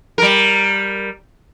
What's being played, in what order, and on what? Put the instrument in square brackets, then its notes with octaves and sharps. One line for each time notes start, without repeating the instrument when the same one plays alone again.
[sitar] G3 A#4